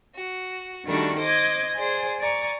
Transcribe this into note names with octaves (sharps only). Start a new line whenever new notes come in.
F#4
D#3 G3 A3 D4 F#4
C5 D#5 D6 G#6
G#4 C5 D5 G#5
D5 G#5 A#5 C#6